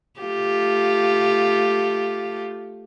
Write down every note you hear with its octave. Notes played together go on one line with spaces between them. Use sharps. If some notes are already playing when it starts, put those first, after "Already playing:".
A3 F4 G4